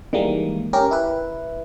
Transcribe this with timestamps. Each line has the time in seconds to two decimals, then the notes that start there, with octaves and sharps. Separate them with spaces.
0.13 D#3 E3 G3 G#3 A#3
0.73 C#4 G4 A#4
0.91 E4 B4